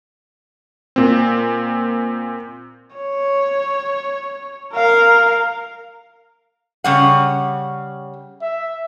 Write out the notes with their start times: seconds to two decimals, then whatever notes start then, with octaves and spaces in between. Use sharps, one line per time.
0.96 A#2 C4
2.97 C#5
4.74 A#4 F5
6.84 C#3 G3 F#5
8.42 E5